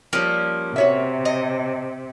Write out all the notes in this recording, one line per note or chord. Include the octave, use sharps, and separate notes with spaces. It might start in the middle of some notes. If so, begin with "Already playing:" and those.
F3 G3 A#3 C#4
C3 F#4 C#5 E5
D#5